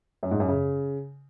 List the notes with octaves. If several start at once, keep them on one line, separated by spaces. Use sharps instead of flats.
F#2
G#2
F#2
C#3